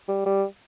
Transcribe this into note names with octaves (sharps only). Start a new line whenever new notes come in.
G3
G3